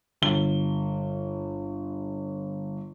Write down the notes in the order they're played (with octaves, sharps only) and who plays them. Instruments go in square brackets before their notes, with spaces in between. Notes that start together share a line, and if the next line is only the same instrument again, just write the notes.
[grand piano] G1 G7